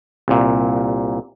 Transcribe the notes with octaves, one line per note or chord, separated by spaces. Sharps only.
C2 A#2